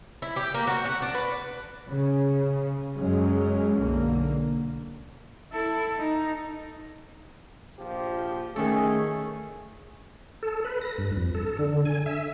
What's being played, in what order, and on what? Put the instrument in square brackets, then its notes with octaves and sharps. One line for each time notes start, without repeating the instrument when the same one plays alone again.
[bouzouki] E4
G4
A#3
F#4
F#5
D4
B4
[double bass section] C#3
F#2 F#3 G#3 C#4
B1 D3 A#3
[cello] E4 A4
D#4
[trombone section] A#1 F3 G4
[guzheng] D#3 A4 [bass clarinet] A3 [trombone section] C#4 [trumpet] G#4
[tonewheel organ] A4
B4
A#6
G2
F2
A4
D3
G#5
E5